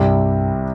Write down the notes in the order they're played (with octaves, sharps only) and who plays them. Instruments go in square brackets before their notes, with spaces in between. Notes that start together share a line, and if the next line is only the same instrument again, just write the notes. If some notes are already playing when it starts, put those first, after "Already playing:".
Already playing: [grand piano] C2 C3 G3 [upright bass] G2